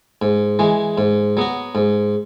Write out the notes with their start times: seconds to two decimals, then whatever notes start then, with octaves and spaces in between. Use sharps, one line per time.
0.22 G#2
0.59 E3 G#3
0.98 G#2
1.37 F#3 B3 F#4
1.75 G#2